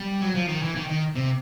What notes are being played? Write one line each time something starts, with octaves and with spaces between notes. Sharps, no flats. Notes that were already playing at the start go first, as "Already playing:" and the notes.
Already playing: G3
F#3
F3
D#3
E3
D#3
D#3
C3